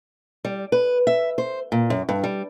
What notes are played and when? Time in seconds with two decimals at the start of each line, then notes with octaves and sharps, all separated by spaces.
0.45 G3
0.72 B4
1.07 E5
1.38 C5
1.72 A#2
1.90 F#2
2.09 G2
2.24 G3